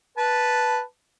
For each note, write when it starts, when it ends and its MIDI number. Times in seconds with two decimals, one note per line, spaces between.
0.17 0.81 71
0.17 0.81 81